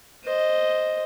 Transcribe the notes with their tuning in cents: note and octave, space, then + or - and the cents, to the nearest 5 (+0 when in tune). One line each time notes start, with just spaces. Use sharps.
C5 +0 D#5 +0